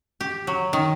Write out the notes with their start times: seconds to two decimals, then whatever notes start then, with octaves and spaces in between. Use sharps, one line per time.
0.21 G4
0.47 F#3
0.73 D#3